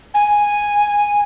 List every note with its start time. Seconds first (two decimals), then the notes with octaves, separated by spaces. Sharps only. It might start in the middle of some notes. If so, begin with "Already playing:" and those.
0.14 G#5